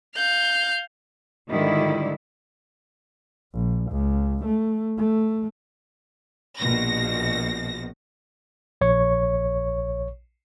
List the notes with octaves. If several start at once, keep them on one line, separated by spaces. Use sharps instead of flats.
F5 G6
G#2 D3 D#3 G3 E4 F4
A#1
C#2
A3
A3
A#1 B2 A#6
A#1 C#5 C#6